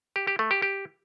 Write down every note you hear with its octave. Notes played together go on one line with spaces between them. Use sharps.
G4
G4
A3
G4
G4